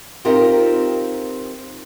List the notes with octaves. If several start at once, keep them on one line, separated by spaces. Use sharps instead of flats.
C4 D#4 F4 G4 A#4